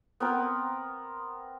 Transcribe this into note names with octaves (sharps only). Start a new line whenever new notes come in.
B3 C4 A#4